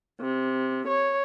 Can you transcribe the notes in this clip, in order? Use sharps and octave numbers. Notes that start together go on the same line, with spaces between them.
C3
C#5